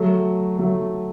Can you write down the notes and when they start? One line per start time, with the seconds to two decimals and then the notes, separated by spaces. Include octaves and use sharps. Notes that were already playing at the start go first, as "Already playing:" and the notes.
Already playing: F#3 A3
0.58 F#3 A3